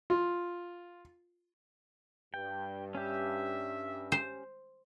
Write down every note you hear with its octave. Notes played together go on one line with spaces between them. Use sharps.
F4
G2 G5
C#4 G4 E5
C5